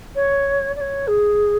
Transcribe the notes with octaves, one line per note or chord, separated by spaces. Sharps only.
C#5
D5
C#5
G#4